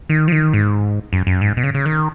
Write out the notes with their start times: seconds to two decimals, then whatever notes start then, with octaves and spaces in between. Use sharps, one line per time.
0.10 D#3
0.28 F3
0.32 D#3
0.53 G#2
1.13 F#2
1.27 F#2
1.41 G#2
1.57 B2
1.64 C#3
1.74 C#3
1.86 D#3